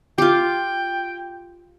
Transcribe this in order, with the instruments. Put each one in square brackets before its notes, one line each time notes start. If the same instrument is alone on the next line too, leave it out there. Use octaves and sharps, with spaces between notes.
[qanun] F4 G4 [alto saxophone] G5